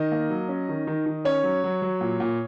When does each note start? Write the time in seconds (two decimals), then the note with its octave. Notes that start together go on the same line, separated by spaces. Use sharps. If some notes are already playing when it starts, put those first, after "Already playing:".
Already playing: D#3 D#5
0.12 A#3
0.30 F#3
0.49 C#4
0.69 D#3
0.87 D#3
1.06 D#3
1.25 C#4 C#5
1.44 F#3
1.64 F#3
1.82 F#3
2.01 A#2
2.20 A#2